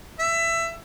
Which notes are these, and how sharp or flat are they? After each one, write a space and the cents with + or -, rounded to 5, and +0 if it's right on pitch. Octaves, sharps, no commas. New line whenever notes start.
E5 +15